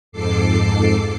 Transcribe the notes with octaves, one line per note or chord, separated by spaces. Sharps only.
F2 G#2 A4 D6 C7